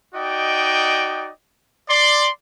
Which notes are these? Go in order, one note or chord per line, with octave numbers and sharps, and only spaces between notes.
D#4 F#4 D5 D#5 G5
D5 C6